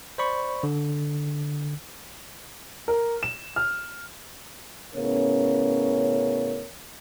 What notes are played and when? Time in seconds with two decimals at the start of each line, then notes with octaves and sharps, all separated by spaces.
0.18 C5 D5 B5 C#6
0.63 D3
2.88 A#4
3.23 E7
3.56 F6
4.94 A2 C#3 B3 C#4 A#4 C#5